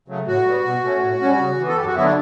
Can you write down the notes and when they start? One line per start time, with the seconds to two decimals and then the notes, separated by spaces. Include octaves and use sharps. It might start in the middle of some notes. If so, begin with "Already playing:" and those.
0.08 C#3 F#3 A3
0.27 A2 F#4
0.46 G3 B3
0.65 B2
0.84 A3 C#4
1.02 A2
1.21 G3 C#4
1.39 C#3
1.58 E3 B3
1.68 A4
1.77 F#2 G4
1.87 F#4
1.95 D3 F#3 B3 E4
2.05 D4